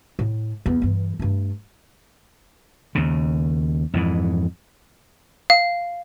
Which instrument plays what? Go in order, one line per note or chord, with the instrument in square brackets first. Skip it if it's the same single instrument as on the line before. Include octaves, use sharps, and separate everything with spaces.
[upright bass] A2
E2 B3
G2 E3
G2 A3
[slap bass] D#2 C#3
F2 G#2 E3
[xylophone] F5